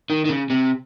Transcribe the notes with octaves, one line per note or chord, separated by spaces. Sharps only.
D#3
D#3
C#3
C3